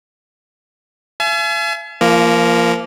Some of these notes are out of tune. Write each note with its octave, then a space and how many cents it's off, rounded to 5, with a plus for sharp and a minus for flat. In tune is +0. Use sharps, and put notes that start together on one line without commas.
E5 +45 G#5 +40
F3 -25 A#3 +0 A#4 +0